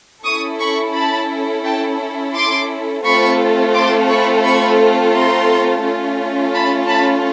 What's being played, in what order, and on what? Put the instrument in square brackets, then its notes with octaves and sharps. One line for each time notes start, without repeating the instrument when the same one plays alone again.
[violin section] C#4 E4 A4 C#6 D#6
B5 C#6
A5 B5
G5 A5
C6 D6
A3 C4 F4 A4 B5 C#6
C6 D6
B5 C#6
B5 C#6
A#5 C6
A3 C#4 F4
A5 B5
A5 B5